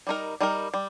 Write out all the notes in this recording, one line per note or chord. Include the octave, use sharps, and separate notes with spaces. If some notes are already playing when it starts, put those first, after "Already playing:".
G3 D#4 A#4
G3 D#4 A#4
G3